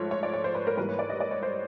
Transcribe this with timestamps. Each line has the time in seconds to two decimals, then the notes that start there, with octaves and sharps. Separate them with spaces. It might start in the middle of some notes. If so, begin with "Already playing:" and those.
Already playing: G#2 F3 A3 C#5
0.11 C#5
0.23 D5
0.33 C#5
0.44 C5
0.55 B4
0.67 A#4
0.77 G#2 E3 G3 A#3 B4
0.89 C#5
0.99 D5
1.10 D#5
1.20 D5
1.31 C#5
1.43 C5